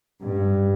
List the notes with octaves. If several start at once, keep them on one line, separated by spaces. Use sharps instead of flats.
G2